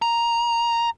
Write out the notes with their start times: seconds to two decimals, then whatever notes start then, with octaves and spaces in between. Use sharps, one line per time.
0.02 A#5